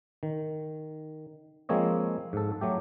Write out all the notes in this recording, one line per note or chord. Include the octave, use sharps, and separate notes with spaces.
D#3
F3 G#3 A#3 C4 C#5 D#5
G#2 A4
F#3 A3 G4